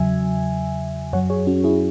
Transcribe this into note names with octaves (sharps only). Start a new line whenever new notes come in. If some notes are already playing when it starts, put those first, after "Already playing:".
Already playing: E2 C#3 F#3 E5 G#5
F#2 F#3 C#5 F#5
G#4 C#5
C#4 F#4
E4 G#4